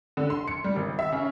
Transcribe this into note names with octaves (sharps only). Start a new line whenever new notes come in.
D3
C6
C#7
G3
G#1
E5
C#3